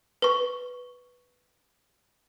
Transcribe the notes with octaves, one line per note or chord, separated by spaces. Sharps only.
B4 C#6